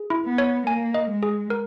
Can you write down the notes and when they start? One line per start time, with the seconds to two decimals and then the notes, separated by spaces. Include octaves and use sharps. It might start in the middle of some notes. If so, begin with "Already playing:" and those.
Already playing: G#4
0.10 E4
0.25 B3
0.38 C#5
0.66 A#3 G#5
0.94 D#5
1.09 G#3
1.23 G#4
1.50 A#4